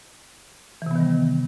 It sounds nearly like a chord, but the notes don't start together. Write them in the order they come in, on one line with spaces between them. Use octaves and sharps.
E3 C3 B3 D#3 G3